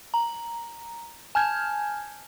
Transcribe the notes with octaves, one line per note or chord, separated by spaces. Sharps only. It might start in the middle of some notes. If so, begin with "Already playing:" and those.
A#5
G#5 A5 F6 G6 G#6